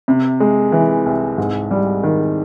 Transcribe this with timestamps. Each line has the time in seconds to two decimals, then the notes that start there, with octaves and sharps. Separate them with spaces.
0.08 C3
0.40 G#3
0.72 E3
1.06 C2
1.38 G#2
1.71 G3
2.03 D#3